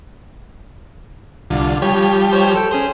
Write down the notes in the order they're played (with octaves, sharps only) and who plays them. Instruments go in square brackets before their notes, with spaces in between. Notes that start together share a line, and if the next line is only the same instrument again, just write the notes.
[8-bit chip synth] C2 [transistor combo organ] D3 F4
[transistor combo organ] F3 G3 G4 [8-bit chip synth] C#5
[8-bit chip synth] C5 C#5
A4 G5
C#4 G#4 C5